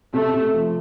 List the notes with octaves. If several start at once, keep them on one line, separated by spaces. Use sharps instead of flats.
C3 A3
C3
F3